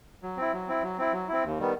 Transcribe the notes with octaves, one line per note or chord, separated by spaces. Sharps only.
F#3
C4 E4
F#3
C4 E4
F#3
C4 E4
F#3
C4 E4
D#2
D#3 G3 B3